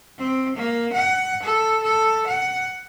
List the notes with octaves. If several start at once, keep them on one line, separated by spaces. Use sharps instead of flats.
C4
A#3
F#5
A4
A4
F#5